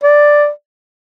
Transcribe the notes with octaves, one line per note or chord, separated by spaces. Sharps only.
D5